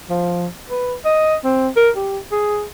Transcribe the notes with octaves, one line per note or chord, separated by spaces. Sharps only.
F3
B4
D#5
C4
A#4
G4
G#4